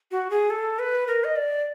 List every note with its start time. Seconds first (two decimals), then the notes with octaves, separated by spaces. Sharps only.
0.11 F#4
0.30 G#4
0.50 A4
0.79 B4
1.07 A#4
1.24 D#5
1.36 D5